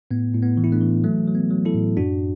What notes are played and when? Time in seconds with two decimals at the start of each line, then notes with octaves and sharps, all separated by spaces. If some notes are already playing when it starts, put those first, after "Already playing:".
0.11 A2 B3
0.34 A2
0.42 B3
0.57 E3
0.64 E4
0.72 A3 D4
0.81 E3
1.04 F#3 A3
1.27 F#3
1.35 B3
1.51 F#3
1.65 E4 A4
1.74 A2
1.97 F#2 D4 F#4